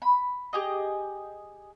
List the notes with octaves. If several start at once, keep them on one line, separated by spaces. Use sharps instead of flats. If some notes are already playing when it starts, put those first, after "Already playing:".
B5
G4 G#4 D#5